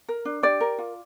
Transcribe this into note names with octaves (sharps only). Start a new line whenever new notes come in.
A#4
D4
G4 D5
A#4
F4